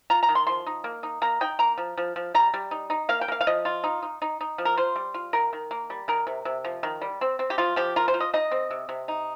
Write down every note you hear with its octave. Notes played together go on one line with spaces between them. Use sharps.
F4 A#5
A#5
D#3
C6
F3 C6
D#4
A#3
D#4
A#3 A#5
D#4 G5
A#3 A#5
F3
F3
F3
G3 A#5
G3
D#4
D#4
A#3 F5
G5
A#3 F5
F5
F3 D#5
F4
D#4
D#4
D#4
D#4
F3
A#4
F4 C5
G3
F4
D#3 A#4
D#3
A#3
G3
D#3 A#4
C3
C3
F3
D#3
G3
C4
C4
G4
F3 F4
F3 G4
F4 A#4
C5
F4
D#5
D#4 D#5
C4
C3
C3
D#4